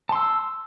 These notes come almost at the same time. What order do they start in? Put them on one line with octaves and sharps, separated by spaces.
A5 C6 E6